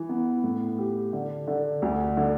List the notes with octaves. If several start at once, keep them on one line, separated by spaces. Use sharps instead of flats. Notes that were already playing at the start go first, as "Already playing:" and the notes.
Already playing: E3
B3
A2
G4
D3
D3
D2
D3